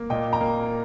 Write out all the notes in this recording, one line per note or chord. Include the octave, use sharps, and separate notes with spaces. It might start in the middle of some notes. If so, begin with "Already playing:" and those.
Already playing: A#3
A#2 D#5 G5
G5 A#5
A#3